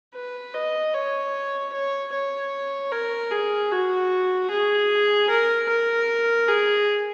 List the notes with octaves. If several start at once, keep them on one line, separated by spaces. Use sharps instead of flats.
B4
D#5
C#5
C#5
C#5
A#4
G#4
F#4
G#4
A#4
A#4
G#4